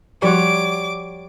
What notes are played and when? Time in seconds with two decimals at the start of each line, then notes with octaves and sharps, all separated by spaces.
0.22 F3 G3 F#4 C#5 F#5 C6 D6